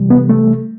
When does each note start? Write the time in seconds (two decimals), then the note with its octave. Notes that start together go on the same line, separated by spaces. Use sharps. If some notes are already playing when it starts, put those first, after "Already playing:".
Already playing: C3 E3 G3
0.10 B3
0.29 A3